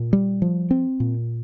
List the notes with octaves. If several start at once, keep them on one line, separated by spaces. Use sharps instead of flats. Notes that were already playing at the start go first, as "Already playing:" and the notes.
Already playing: A#2
G3
F3
C4
A#2